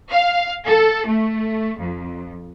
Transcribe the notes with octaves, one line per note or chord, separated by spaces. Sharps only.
F5
A4
A3
F2